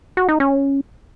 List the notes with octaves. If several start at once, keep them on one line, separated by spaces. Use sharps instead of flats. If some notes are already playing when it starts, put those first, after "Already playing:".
F#4
D#4
C#4